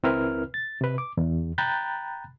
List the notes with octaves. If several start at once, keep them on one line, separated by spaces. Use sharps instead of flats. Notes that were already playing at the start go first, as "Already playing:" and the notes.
C#2 C4 E4 A#4 B4 F6
A6
C3 B4
D6
E2
G5 A#5 B5 F#6 G6 A6